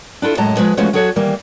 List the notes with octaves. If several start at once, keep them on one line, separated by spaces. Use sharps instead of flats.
D4 E4 F4 A4
F#2 A2 G#3 D#5 A5 A#5
F3 G#3 G#4 B4
E3 F3 G#3 A3 C#4 F#4
F#3 F#4 G#4 A4 C#5
D#3 E3 G3 A#3